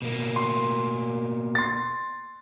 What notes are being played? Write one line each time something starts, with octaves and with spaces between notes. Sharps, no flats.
B2 A#3
C6
C6 A6